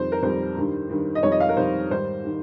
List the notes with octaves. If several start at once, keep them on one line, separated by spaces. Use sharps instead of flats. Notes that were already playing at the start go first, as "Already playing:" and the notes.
Already playing: F2 D#3 G3 C5
A#4
F2 D#3 G3 C5
G2 D#3 G3
G2 D#3 G3
D#5
F2 D#3 G3 C#5
D#5
F5
A#4
F2 D#3 G3 C5
G#2 D#3 G3 C5
D#3 G3